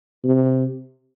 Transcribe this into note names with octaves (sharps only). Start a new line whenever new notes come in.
C3